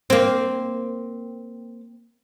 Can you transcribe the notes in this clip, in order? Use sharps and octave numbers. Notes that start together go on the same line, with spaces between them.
A#3 C4